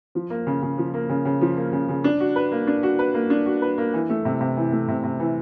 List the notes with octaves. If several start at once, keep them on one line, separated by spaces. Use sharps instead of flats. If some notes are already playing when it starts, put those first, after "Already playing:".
F3
A#3
C#3
C#3
F3
A#3
C#3
C#3
F3
A#3
C#3
C#3
D4
F#4
B4
A#3
D4
F#4
B4
A#3
D4
F#4
B4
A#3
E3
A3
C3
C3
E3
A3
C3
C3
E3